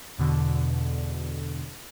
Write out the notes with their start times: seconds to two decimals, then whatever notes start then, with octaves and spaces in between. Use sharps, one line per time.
0.18 E2 B2 D3